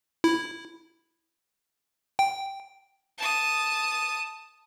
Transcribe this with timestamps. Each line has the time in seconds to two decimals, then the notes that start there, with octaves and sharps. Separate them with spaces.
0.24 E4
2.19 G5
3.18 A5 D#6